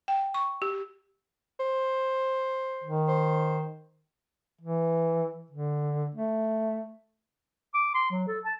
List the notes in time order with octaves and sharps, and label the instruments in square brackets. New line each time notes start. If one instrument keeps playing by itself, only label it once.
[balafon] G5
C#6
G4
[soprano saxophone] C5
[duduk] D#3
[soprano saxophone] C5
[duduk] E3
D3
A3
[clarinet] D6
C6
F#3
A4
A5